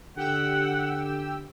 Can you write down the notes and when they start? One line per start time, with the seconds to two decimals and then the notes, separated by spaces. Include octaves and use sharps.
0.17 D3 G4 F#5 G5 E6